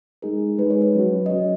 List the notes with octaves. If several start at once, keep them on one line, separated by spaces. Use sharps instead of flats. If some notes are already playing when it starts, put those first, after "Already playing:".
G#3 D#4 G#4 A#4
G#3 D#4 G#4 B4
C#5
B4
F#3 C#4 F#4
D#5
F#3 C#4 F#4 C#5